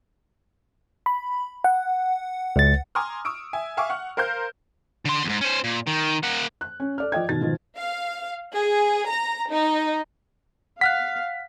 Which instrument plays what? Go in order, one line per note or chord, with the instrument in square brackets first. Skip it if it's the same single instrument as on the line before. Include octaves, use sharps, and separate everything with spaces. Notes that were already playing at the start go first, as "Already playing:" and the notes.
[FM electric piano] B5
F#5
[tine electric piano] C#2 A6
[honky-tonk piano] G#5 A#5 C6 D6 D#6 F6
C#6 D#6 E6 D7
E5 G#5
E5 F5 G#5 C#6 D6
F#5 C#6 F6
A#4 C5 F5 F6 G6
[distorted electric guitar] D3 C6
E2 G#2
C#4 C5
A#2
D#3
A#3 F#5
[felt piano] F#6
C#4
A4 D5 F6
F3 D5 D#5 G5 G#6
B2 D#3 A6
G#2 B2 D#3 F3
[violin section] F5
G#4
A#5
D#4
[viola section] F5 [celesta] F#5 F6 F#6 [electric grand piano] B6